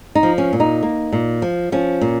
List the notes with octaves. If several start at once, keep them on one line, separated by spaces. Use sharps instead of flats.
D#4
F3
C#4
A#2
D#4
A#3
A#2
F3
F3 C#4
A#2